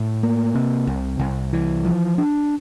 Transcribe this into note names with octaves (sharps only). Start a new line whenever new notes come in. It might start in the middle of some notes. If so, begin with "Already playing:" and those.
Already playing: A2
A#3
C3
C2
C2
E3
F3
D4